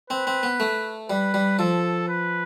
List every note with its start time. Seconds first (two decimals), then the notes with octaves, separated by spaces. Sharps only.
0.10 C4 B4
0.27 C4
0.43 B3
0.60 A3
1.09 G3 B4
1.34 G3
1.59 F3 A4
2.08 B4